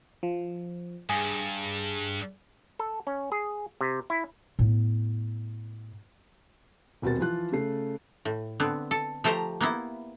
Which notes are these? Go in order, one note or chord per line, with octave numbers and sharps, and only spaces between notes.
F3
G2 G#4
A4
C#4
G#4
C3
E4
A2 B3
D#1 B2 C4 F#4 A#4 A6
E3 F3 F4 F#6
C#3 A3 C7
A2
D3 B3 C4
A4
F3 A3 G4 C5 A#5
A#3 B3 E4